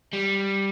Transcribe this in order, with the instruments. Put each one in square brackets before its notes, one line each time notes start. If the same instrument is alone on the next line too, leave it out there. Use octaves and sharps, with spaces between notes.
[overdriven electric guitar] G3